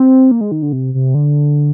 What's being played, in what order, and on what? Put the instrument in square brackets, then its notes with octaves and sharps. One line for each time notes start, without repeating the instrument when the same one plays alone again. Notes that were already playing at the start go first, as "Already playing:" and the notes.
Already playing: [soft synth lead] C4
A#3
G#3
D#3
D3
C3
C3
D3